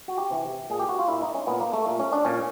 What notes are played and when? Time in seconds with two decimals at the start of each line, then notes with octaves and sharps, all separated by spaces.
0.08 F#4
0.18 G4
0.30 C3 E3
0.70 A#2 G#4
0.79 G4
0.89 F#4
0.99 F4
1.08 A#2 E4
1.22 D#4
1.35 C#4
1.47 A#2 B3
1.60 A#3
1.73 A3
1.87 A#2
1.99 C#4
2.13 D4
2.25 A#2 C#4